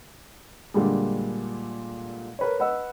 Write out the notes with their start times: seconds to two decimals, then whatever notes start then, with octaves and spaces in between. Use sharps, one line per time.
0.74 A#2 D3 G3 G#3
2.39 A#4 B4 C#5
2.60 B4 D#5 F#5 E6